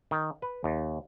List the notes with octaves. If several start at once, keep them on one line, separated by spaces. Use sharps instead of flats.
D#3
B4
D#2